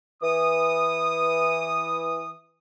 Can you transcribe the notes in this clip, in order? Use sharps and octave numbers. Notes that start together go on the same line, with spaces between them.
E3 D#6